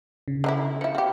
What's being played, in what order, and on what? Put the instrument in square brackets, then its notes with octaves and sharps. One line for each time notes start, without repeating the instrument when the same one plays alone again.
[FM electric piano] C#3
[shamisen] D3 D#4 E4
[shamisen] F3 E4 [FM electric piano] C#7
[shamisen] F#4 G4 [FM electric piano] F5 B5